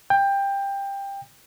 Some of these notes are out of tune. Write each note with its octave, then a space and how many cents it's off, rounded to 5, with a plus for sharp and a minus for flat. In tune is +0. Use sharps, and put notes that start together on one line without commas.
G5 +15